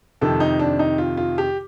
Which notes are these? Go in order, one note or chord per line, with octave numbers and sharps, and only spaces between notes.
F2 C3 D#3 A4
D#4
D4
D#4
F4
F4
G4